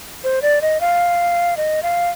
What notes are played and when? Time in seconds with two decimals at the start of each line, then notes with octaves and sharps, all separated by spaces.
0.24 C5
0.42 D5
0.62 D#5
0.81 F5
1.57 D#5
1.83 F5